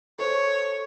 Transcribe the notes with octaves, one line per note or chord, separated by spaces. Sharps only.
A4 C5 C#5